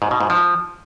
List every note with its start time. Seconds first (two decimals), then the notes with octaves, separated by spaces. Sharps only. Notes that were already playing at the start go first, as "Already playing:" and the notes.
0.02 G#2
0.11 B2
0.20 G#2
0.30 F3